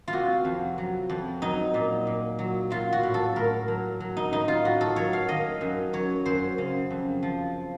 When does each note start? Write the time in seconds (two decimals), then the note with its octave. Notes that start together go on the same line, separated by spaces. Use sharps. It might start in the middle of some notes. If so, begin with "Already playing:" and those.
0.08 F4
0.13 C3 F#4
0.45 F2
0.78 F#3
1.09 F2
1.42 F#3 D#4
1.74 A#2
2.07 A#2
2.39 F#3
2.70 F#3 F4
2.93 F#4
3.03 A2
3.14 A4
3.36 A2 A#4
3.68 F#3
4.00 F#3
4.17 D#4
4.32 A2 D#4
4.48 F4
4.65 A2 F#4
4.81 A4
4.96 F#3 C#5
5.13 F5
5.29 D#3 D#5
5.61 F#2
5.93 F#3 C#5
6.26 F#2 C5
6.58 C#3
6.91 F2
7.23 F3